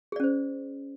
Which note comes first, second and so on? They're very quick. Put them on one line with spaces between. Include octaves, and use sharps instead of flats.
G#4 D5 C#4 C5